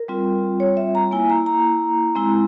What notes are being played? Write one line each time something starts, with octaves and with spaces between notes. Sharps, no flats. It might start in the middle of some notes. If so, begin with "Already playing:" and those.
Already playing: A#4
G3 C4 F4
C#5
E5
A#5
A#3 E4 G#5
A#5
A#5
G#3 C4 E4